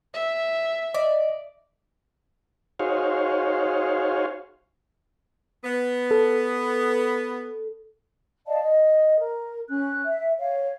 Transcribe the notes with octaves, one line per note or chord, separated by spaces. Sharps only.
E5
D5 D#5
D#4 F#4 G#4 C5 C#5 F5
B3
A4
D5 D#5 F5 A5
D#5
A#4
C#4 F#6
E5
C#5 F5